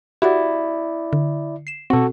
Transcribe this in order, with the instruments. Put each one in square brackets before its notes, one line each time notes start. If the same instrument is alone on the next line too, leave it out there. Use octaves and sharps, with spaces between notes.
[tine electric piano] E4 D5 [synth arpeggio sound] F#4 G4 F#5
[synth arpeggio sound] D3
C7 E7
[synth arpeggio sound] B2 C4 [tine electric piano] F#4 A4